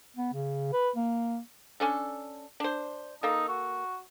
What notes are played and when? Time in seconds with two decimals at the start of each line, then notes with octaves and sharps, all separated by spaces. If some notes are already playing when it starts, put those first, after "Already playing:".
0.16 B3
0.33 C#3
0.73 B4
0.96 A#3
1.80 C#4 D4 A4
2.60 D4 C5
3.23 A#3 D#4 A4
3.48 F#4